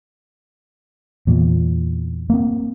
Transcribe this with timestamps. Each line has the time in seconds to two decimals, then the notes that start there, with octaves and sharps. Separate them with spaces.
1.27 E2 A#2
2.30 A#3 C4